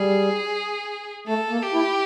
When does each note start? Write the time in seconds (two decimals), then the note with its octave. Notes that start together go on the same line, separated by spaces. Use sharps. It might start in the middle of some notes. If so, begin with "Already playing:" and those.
Already playing: G3 G#4
1.27 A3 A4
1.50 A#3
1.63 G4
1.74 E4